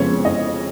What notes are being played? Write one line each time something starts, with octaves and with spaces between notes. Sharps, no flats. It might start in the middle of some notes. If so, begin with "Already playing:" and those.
Already playing: F2 C#3 G#3 B3 C#5
D#5